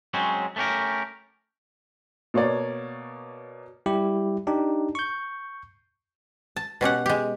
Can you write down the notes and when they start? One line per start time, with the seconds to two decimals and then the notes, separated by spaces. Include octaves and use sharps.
0.14 F#3 G#3 C4 C#4
0.56 A3 B3 C#4 G4 A#4
2.34 B2 A#3 C#5 D5
3.86 G3 E4 G4
4.47 D4 D#4 G4
4.95 C#6 G6
6.56 A5
6.81 B2 C#4 G4 F#5
7.06 G#3 G4